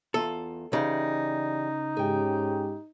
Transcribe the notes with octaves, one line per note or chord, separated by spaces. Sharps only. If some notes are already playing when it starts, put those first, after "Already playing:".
E2 F4 A4 A#5
C#3 E3 D#4 G4 D5
G#2 C#4 G4 G#4 G5